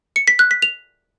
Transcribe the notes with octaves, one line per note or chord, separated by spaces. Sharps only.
C#7
B6
F#6
B6
F7